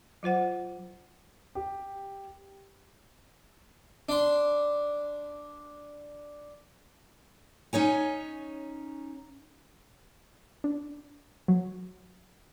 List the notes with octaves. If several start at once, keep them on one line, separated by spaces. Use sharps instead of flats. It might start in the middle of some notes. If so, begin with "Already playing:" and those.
F#3 F4 C5 F#5
G4
D4 C6
C#4 D#4 C#5 G#5
D4
F#3